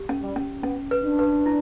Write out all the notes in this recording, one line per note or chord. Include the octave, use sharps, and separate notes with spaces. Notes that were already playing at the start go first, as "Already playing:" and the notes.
Already playing: G4
C#4
G3
C#4
B3 C#4
B4
D4
B4
E4